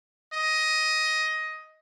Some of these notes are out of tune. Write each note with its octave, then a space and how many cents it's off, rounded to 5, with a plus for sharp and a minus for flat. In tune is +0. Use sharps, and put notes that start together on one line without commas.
D#5 +10